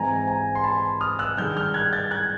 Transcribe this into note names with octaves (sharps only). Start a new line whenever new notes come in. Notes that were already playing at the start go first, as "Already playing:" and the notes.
Already playing: G#2 E3 G#3 C4 G#5 A#5
G#5 A#5
C6
A5 B5
D#6 F6
E6 F#6
G2 D#3 G#3 F6 G6
F6 G6
F#6 G#6
G6 A6
F#6 G#6